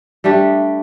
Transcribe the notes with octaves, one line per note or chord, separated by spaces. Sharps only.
G3 A3 D4 G4